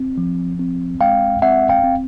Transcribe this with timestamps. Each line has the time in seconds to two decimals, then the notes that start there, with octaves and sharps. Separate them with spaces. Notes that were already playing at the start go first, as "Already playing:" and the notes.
Already playing: C4
0.18 F3
0.59 C4
1.01 G#3 F5 G5
1.42 C4 E5 F#5
1.69 F5 G5
1.84 C4